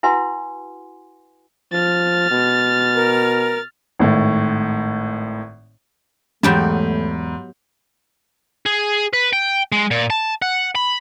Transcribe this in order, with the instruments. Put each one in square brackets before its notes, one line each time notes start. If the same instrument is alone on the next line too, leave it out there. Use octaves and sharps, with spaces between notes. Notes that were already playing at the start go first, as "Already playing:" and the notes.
[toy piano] E4 F#4 B4 F#5 G#5 C6
[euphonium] F3 [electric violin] F6 A6
[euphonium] B2
[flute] A#4
[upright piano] G#1 A2
[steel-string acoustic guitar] E2 [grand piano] G#2 B5 G6 [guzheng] F#3 G4 A5 [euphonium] A3
[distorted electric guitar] G#4
B4
G5
G#3
A#2
A5
F#5
B5